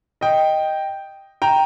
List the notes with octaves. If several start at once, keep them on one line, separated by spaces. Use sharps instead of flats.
D#5 G5
G5 A#5